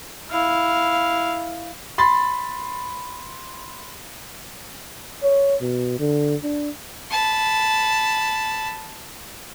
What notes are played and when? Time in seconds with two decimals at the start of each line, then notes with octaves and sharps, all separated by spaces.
0.31 E4 F5
1.98 B5 C6 A6
5.23 C#5
5.61 B2
5.99 D3
6.44 D4
7.11 A5 B5